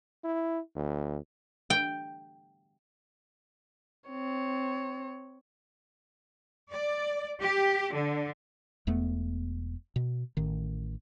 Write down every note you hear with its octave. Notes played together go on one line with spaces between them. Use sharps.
E4
D2
G5
C4 C#5
D5
G4
D3
E1 E2 A3 B3
B2
A1 D#3